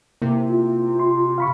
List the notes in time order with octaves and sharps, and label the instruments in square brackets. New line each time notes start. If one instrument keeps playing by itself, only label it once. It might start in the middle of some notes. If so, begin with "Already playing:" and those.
[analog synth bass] C3 [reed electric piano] A#3 E4
[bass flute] F4
[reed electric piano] C6
F5 B5 C#6